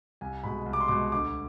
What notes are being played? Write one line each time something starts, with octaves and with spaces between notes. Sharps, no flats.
C2 G#5
B2 G#3 B5
C2
D6
C6
B2 G#3 D6
D2 D6